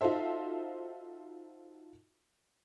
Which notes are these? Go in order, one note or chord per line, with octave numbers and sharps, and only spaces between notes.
D#4 F4 F#4 A4 C5 E5